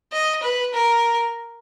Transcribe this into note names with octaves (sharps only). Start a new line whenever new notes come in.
D#5
B4
A#4